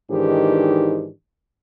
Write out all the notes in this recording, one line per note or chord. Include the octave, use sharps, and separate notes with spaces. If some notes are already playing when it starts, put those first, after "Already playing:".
G#2 D#3 E3 D4 G4